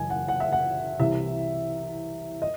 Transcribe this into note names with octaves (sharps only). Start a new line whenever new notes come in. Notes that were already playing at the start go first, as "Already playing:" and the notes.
Already playing: F#1 F#2 C#3 E3 D#5 G#5
F#5
F#5
E5
F#5
C2 C3 E3 E5
D#5